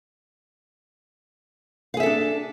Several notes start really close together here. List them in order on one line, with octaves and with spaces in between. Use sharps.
F5 G#4 E5 A4 D4